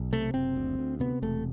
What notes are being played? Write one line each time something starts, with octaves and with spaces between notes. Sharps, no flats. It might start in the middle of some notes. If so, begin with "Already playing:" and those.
Already playing: B1
C3 A3
F#1 C4
D2
D2
C3 B3
E1 A3